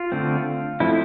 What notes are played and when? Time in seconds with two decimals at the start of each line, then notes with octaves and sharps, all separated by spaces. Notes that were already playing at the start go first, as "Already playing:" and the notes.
Already playing: F4
0.12 D3 A3 C4
0.80 F3 A3 C4 E4